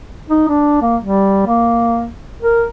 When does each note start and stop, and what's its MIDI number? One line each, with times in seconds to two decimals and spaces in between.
0.30 0.47 63
0.48 0.81 62
0.82 0.97 58
1.03 1.45 55
1.47 2.07 58
2.41 2.65 70